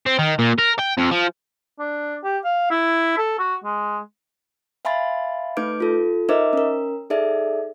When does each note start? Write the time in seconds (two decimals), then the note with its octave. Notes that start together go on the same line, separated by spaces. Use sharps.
0.06 C4
0.19 D#3
0.39 A#2
0.58 A#4
0.79 G5
0.98 F2
1.11 F3
1.79 D4
2.23 G4
2.44 F5
2.70 E4
3.18 A4
3.39 F#4
3.64 G#3
4.85 E5 F5 G#5 B5 C6 A6
5.57 A3 D#4 B4 D6 G6 D7
5.80 F4 A4
6.29 D#4 A#4 C5 D#5 E5 D6
6.53 C#4 A#4
7.10 D#4 G#4 A4 D5 E5